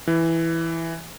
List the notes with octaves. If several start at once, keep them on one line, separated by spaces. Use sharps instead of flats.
E3